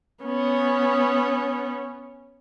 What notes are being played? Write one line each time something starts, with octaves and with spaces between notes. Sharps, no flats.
B3 C#4